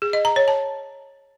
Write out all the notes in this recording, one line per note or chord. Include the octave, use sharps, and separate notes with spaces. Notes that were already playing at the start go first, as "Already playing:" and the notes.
G#4
D#5
A#5
C#5
A5